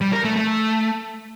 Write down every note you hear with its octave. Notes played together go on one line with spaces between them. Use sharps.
G3
A#4
A3
A3